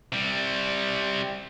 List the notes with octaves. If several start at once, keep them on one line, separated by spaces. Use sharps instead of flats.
C3 G3